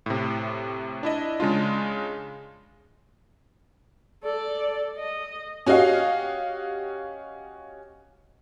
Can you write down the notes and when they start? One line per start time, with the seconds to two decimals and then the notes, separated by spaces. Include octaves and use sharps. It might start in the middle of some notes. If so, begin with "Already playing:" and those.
0.06 A2 C3
1.03 D4 E4 D#5
1.40 C#3 G#3 D4 F4
4.24 A4 D5
4.97 D#5
5.66 C#4 F#4 G4 D#5 F5